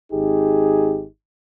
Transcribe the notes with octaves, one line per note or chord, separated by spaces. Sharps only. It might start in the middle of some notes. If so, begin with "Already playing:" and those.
G#1 D#4 G4 G#4